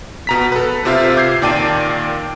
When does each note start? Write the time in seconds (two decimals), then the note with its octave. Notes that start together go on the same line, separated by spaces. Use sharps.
0.27 B2 A#5 B6
0.52 A4 B4
0.85 C3 C4 F4 E5 F5
1.17 D6 G6 G#6 C7
1.42 A#2 D#3 D5 G5 A5 D#7